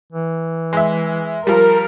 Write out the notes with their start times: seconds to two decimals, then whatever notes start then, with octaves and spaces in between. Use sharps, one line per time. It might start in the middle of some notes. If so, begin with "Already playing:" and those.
0.12 E3
0.73 G#3 E5
1.47 F3 G3 A#4